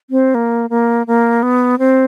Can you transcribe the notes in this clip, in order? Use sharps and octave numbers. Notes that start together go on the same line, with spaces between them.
C4
A#3
A#3
A#3
B3
C4